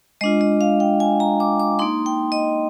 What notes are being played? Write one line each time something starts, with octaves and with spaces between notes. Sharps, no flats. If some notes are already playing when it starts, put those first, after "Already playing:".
G#3 D4 F4 D#5
D#5
F5
G5
G#5
A#5
D6
D6
A#3 D#4 C6
G5
D#5